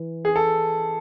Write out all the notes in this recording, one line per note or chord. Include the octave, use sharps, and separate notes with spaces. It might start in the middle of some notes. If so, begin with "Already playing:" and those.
Already playing: E3
G#4
A4